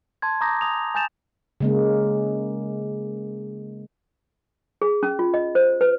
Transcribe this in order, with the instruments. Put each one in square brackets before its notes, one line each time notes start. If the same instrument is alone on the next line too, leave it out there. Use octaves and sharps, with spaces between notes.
[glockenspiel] A5 C6 G#6
A#5 D6 D#6 G6 A#6
G#5 D#6 F7
G#5 A5 G6 A6 E7 F7
[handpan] C#3 G#3 A#3
[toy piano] G#4
C#4
F4
D#5
C5
B4